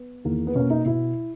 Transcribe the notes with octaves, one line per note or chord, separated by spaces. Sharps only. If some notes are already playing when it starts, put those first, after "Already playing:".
Already playing: B3
E2 D#3 A#3
B3
B2 A#3 C#4
D#4
B2 E4